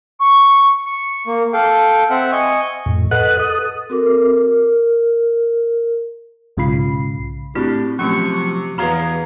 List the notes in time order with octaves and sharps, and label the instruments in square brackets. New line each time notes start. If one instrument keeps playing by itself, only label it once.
[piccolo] C#6
[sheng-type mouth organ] C#6
A#3
A4 F5 G5
C4 E5 F#5
D#5 G#5 C#6
[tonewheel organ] F2 A2
A4 B4 D#5 F#5 F#6
A4 D#6
[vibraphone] C4 F#4 A4 A#4 D6
A#4
[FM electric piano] B1 G#2 C#3 F4 B5 C7
[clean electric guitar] A2 D4 [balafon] C4 E4 F#4 [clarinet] G4
[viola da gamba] C3 [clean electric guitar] F3 F#3 [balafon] A3 C#4 [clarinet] C#6
[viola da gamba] E2 [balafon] F#4 B4 [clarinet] G#4 [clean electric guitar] C#5 F5 A#5